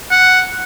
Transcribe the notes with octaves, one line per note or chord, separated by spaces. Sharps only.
F#5